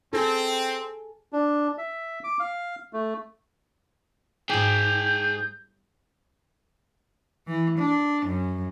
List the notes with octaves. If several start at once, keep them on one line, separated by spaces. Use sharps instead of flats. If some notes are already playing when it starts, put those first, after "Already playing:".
C4 G#4 A4
D4
E5
D6
F5
A3
E2 G#2 G#4 G5 G6
E3
D4
F#2